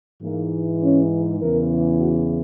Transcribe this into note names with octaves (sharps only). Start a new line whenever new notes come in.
G#2 E3 A#3
C#4
E2 C#3 E3 A#4
F#4